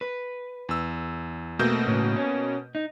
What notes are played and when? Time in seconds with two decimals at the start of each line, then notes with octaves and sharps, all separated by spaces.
0.01 B4
0.69 E2 E6
1.59 B2 A3 A#3 C4 G6
1.87 A2 C#3
2.16 C#4
2.75 D#4